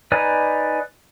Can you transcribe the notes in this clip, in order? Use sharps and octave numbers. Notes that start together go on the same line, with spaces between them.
D#4 B4 D5 G#5 A#5